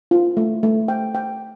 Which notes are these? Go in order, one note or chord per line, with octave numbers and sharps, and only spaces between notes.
F4
A3
A3
G5
G5